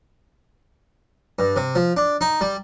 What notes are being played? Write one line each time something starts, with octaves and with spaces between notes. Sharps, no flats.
G2
C3
F3
D4
D#4
G3